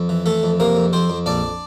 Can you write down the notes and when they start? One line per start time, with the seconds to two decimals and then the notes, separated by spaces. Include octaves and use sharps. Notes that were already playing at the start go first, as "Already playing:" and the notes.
Already playing: F2
0.09 E3
0.26 E3 A3 A4
0.43 F2
0.60 C3 A#3 A#4
0.77 F2
0.93 F2 C4 C5
1.10 F2
1.26 A#1 D4 D5